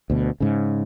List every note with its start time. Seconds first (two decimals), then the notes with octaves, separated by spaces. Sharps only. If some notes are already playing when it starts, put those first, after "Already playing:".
0.10 D2 B2
0.40 G#2 C#3